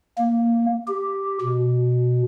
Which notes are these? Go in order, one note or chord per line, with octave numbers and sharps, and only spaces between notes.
A#3
G4
B2